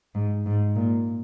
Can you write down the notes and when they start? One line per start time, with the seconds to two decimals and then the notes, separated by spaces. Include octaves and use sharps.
0.15 G#2
0.46 G#2
0.76 A#2